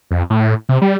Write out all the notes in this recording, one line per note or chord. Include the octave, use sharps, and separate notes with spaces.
F2
A2
C3
G3